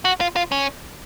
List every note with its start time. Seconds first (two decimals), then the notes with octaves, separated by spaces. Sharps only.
0.05 F#4
0.21 F4
0.36 F4
0.52 C#4